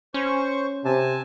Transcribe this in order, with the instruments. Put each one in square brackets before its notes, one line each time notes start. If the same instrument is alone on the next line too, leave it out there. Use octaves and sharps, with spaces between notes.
[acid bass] C#4 [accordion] C5 C#6
[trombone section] C3 [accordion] G#5 A5